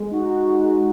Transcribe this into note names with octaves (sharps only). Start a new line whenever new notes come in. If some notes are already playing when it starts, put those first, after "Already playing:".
Already playing: G#3
D#4 F#4
G#3